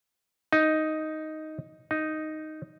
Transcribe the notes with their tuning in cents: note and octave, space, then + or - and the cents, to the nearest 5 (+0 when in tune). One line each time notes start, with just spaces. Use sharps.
D#4 +5
D#4 +0